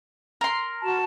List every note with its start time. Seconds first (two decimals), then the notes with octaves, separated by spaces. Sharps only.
0.41 A#4 C6
0.82 F#4 A5